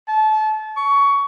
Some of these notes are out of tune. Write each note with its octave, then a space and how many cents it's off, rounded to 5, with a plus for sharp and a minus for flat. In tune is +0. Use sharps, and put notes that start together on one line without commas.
A5 -30
C#6 +20